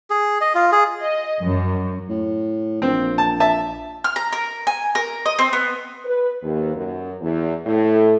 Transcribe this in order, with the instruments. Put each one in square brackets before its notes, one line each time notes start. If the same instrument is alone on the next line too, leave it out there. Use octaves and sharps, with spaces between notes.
[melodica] G#4
D#5
F4
G#4
[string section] D#5
F#2
[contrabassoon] A2
[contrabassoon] A#1 [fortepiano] C4
[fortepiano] A5
E5 A5
[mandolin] F6
A#5
A#4
G#5
A#4
D#5
C4
B3
[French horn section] B4
D#2
F#2
E2
A2